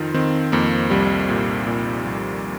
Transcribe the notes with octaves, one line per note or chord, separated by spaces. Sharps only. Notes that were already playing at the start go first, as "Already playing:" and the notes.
Already playing: F2 D#3 D#4 F4
D#3 C4
F2 A#3
C2 G3
A#2
A#2
C2